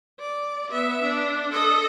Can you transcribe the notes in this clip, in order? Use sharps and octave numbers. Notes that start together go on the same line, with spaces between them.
D5
B3 E5
D4
A4 D#5